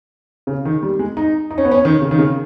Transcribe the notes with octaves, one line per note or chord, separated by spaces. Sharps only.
C#3
D#3
G3
G#3
D#4
D#4
C#4
B3
C#4
D#3
C#3
D#3
C#3